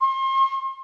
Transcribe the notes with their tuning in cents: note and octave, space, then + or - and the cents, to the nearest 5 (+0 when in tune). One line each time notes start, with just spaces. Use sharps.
C6 +40